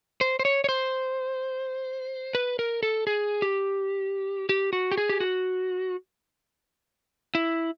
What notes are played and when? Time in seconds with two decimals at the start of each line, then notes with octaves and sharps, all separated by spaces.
0.21 C5
0.39 C5
0.45 C#5
0.64 C#5
0.69 C5
2.35 B4
2.59 A#4
2.83 A4
3.07 G#4
3.42 G4
4.49 G4
4.73 F#4
4.92 G4
4.98 G#4
5.09 G4
5.20 F#4
7.35 E4